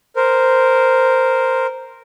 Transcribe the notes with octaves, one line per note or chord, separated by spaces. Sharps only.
A#4 C5